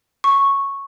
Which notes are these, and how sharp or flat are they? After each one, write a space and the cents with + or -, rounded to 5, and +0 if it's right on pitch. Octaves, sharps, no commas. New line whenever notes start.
C#6 -5